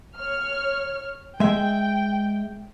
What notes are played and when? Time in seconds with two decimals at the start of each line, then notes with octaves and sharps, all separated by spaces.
0.18 C#5 F6
1.40 G#3 E5 G5